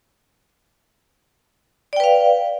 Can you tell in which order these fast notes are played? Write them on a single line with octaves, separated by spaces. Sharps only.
D5 G5 B4 F5